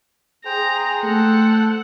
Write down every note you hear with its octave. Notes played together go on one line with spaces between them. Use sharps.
G#4 C5 G5 A#5
A3 A4 F#5